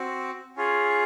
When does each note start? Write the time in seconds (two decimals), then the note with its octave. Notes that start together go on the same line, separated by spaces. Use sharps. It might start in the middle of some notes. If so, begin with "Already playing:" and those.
Already playing: C4 F#4
0.57 C#4 F4 G#4